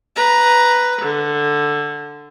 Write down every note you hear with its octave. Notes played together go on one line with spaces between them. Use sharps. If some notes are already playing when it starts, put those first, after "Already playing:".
B4 A#5
D3